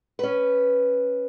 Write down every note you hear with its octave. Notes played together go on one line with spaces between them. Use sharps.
C#4 B4